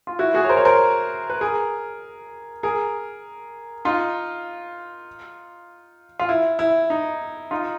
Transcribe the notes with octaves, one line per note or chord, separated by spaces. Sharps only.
F4
E4 F#4
F#4 G#4
C#5
A#4 C5
C#5
A#4 C5
B4
G#4 A#4
G#4 A#4
D#4 F4
F4
E4
E4
D#4
D#4 F4